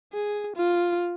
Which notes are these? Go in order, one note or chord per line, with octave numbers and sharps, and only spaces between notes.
G#4
F4